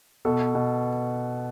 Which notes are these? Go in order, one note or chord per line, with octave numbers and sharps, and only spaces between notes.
B2 A4
B2